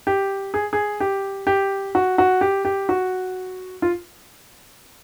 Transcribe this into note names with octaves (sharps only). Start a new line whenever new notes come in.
G4
G#4
G#4
G4
G4
F#4
F#4
G4
G4
F#4
F4